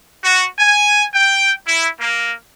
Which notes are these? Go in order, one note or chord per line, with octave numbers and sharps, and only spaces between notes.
F#4
G#5
G5
E4
A#3